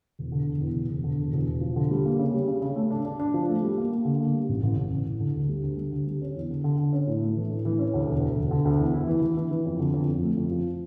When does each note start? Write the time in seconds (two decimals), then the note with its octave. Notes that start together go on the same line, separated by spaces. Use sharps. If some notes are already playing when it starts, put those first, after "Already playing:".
0.19 E1
0.32 D3
0.46 E1
0.61 E2
0.75 E1
0.90 E1
1.04 D3
1.19 E1
1.33 E1
1.48 E1
1.61 F3
1.76 D3
1.91 G3
2.05 A#3
2.19 C#3
2.34 G3
2.48 C#3
2.62 C#3
2.76 A3
2.90 D4
3.05 D4
3.20 D4
3.34 F3
3.49 A3
3.63 G3
3.77 A#3
3.92 A#3
4.05 D3
4.20 A#3
4.34 G3
4.49 A1
4.63 A1
4.77 A1
4.92 A1
5.06 A1
5.20 D3
5.35 D2
5.49 G3
5.63 D2
5.77 G3
5.92 D3
6.07 G3
6.22 C#4
6.35 E2
6.50 D3
6.64 D3
6.78 D3
6.93 C#4
7.07 A2
7.21 A3
7.36 E3
7.50 A2
7.65 E3
7.79 C#4
7.94 D2
8.07 E1
8.21 D2
8.36 E1
8.51 D3
8.65 D2
8.79 E2
8.94 E4
9.07 E3
9.22 E3
9.37 E3
9.51 E3
9.66 F2
9.80 D3
9.94 F2
10.08 F2
10.23 A3
10.37 F2
10.51 F3